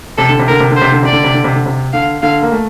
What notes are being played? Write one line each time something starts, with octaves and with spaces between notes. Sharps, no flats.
C3 A4
D3
C3
D3 A#4
C3
D3
C5
C3
D3
C3 D5
D3
C3
D3
C3
D3
C3
D3 F5
D3 F5
A#3
A3